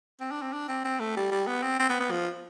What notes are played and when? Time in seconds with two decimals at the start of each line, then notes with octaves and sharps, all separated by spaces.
0.20 C4
0.31 D4
0.42 C4
0.53 D4
0.68 C4
0.84 C4
1.00 A3
1.16 G3
1.31 G3
1.47 B3
1.63 C4
1.79 C4
1.89 B3
2.00 B3
2.11 F3